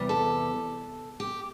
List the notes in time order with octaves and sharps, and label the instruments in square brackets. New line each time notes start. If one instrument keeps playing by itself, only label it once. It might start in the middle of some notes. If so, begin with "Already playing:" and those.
Already playing: [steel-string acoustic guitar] E2 C3 G3
A4
G4